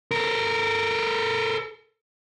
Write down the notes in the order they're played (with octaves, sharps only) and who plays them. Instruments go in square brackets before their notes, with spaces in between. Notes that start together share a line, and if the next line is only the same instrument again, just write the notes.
[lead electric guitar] A4 A#4